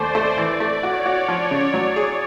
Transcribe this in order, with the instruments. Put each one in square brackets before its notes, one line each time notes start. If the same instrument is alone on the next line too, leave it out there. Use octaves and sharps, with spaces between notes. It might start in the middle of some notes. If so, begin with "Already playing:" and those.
Already playing: [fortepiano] D#2 A3 [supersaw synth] C5 D5
[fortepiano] A3
[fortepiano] E3 [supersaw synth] D5
[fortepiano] A3
[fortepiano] F#4 [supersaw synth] C#5
[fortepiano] F#4
F3
C#3
F#3
G#4